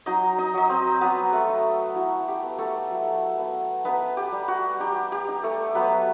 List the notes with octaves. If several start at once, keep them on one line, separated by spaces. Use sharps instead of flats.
F#3 D#4 D#5
D#4 D#5
F#3 D#5
C4 C5
F#3 B3 B4
A3 A4
D#4
E4 F#4
G4
B3
A3 A4
F#3
B3
B3 D#4 B4
G4
G3
F#4
D#4 G4
G4
D#4
A3 A4
F#3 B3 B4